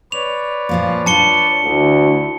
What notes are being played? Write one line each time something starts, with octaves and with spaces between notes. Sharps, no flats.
B4 C#5 D5 F7
A#2 F3 A#3
D4 F4 A5 C#7 G7
D2 E4